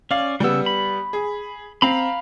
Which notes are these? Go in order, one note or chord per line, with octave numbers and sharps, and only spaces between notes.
C#4 D5 F5
C#3 G3 B3 E6
B5
G#4
C4 F5 A#5 B5